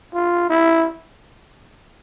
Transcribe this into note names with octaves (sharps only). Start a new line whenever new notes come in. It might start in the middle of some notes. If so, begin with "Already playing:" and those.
F4
E4